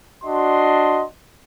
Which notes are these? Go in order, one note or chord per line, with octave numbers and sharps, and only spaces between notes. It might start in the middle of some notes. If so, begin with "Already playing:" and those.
D4 F#4 D#5 C6